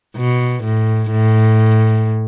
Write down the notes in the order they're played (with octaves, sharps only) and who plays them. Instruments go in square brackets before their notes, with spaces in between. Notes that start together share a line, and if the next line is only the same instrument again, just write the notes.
[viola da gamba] B2
A2
A2